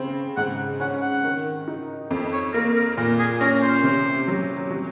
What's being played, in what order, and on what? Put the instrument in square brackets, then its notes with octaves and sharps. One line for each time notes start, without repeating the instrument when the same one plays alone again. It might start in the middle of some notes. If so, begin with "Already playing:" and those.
Already playing: [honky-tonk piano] C#3 C4
[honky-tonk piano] G#2 [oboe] F#5
[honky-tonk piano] C#4 [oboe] F#5
[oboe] F#5
[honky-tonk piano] D#3
D#4
F2
[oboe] C#5
[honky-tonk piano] A#3 [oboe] A#4
[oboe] A#4
[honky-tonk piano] A#2 [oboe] A#4
[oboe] G#4
[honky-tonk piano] C#4 [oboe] A#4
[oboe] C5
[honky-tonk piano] C3
F#3
F#3